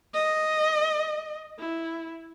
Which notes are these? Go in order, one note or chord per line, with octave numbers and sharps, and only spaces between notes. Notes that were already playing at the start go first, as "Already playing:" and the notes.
D#5
E4